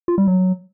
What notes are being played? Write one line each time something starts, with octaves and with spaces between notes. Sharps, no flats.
F4
G3
F#3